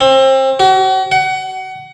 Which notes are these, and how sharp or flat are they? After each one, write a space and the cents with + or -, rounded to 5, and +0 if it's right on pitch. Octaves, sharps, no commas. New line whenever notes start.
C4 +30
F#4 +40
F#5 +25